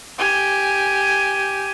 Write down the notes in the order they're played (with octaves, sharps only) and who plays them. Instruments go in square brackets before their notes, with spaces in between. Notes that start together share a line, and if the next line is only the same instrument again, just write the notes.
[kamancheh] G4 G#5